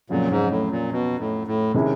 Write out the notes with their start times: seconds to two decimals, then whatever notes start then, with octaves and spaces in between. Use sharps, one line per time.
0.10 F2 A#2 C#3 F#3
0.30 G#2
0.50 A2
0.71 A#2
0.92 B2
1.19 A2
1.47 A2
1.74 C3 D#3 G#3 C#4 E4